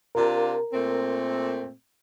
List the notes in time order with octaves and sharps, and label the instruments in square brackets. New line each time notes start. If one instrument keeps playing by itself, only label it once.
[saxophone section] C3 D4 F4 [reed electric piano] A#4
[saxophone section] A#2 A3 C4